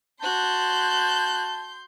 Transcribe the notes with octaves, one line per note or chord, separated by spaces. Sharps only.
F#4 A5 C6 F#6 G6